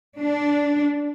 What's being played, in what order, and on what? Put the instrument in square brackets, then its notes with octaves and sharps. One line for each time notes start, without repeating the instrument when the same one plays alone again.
[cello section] D4